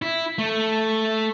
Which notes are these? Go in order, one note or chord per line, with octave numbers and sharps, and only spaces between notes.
E4
A3